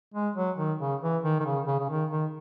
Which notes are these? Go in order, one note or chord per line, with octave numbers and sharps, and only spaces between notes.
G#3
F#3
D#3
C#3
E3
D#3
D#3
C#3
C#3
C#3
D#3
D#3